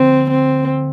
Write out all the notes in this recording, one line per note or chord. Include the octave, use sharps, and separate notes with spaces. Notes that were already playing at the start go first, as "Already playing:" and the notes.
Already playing: D2 D3 F3 C4
C4